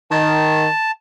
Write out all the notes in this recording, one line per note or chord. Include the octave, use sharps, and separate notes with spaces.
D#3 A5